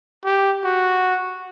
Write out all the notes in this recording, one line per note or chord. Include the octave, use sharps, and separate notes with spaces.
G4
F#4